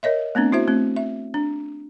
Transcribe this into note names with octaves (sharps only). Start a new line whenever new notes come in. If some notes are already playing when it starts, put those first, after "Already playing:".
A#4 C#5 D#5 E5
A3 B3 C4 D4
E4 F#4 C5 E5
A3 C4
E5
D4